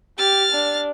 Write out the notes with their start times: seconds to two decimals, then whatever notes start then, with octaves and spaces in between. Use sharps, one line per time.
0.18 G4 F6 A6
0.52 D4